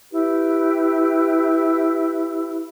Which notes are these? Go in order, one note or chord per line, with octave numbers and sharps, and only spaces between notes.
E4 G4 B4